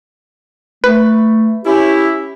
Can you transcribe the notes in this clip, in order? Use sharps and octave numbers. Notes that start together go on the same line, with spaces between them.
A3 B4
C#4 E4 G4